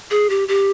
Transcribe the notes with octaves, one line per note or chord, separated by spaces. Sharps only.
G#4
G4
G4